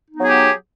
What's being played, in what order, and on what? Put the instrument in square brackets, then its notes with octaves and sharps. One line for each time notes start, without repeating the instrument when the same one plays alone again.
[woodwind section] D#4
B3
F#3
G#4
G4